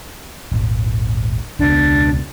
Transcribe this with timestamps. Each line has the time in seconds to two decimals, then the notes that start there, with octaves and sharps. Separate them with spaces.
0.52 D#1 G#1
1.59 E1 C#2 B2 D4